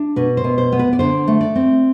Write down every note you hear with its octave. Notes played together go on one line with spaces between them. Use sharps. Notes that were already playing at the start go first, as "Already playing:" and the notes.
Already playing: D4
B2 B4
C5
B2
C5
B3
B4
D5
D3 C5
A3
D5
C4